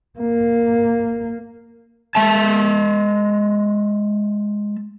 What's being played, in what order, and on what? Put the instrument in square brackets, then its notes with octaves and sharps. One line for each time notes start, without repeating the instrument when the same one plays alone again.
[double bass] A#3
[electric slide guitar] G#3 E5 A5